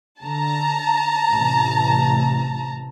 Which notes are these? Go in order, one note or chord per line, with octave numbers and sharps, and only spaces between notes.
D3 A5 A#5
A1 C3